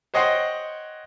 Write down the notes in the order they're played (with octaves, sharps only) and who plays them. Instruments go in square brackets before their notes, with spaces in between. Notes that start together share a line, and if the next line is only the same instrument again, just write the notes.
[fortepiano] C5 C#5 D#5 F#5 G5 C6